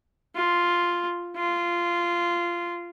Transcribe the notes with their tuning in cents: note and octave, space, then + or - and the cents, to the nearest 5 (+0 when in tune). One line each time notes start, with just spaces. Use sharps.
F4 +0
F4 -15